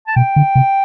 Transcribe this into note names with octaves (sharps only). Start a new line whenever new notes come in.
A5
B2 G5
D3
C3